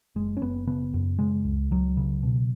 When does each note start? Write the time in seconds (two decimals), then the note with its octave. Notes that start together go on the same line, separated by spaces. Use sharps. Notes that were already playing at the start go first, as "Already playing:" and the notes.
0.16 F#1 G#3
0.37 C#4
0.41 F#1 B3
0.67 C#3 B3
0.94 F#2
1.19 C#3 G#3
1.45 C#2
1.71 C#2 F#3
1.97 C#3
2.23 B2